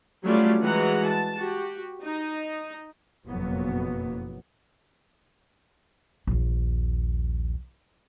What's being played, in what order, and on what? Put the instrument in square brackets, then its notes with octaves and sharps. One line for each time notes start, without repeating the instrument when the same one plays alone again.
[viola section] F#3 G3 A3 C#4 F4 D5
E3 G#3 F#4 F#5 A#5
A5
F#4 G4
D#4
[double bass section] F#1 F2 B2 F#3 A#3 B3
[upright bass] A#1 D#2